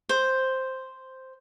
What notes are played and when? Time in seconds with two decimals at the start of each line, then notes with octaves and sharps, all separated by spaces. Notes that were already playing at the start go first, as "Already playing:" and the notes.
0.09 C5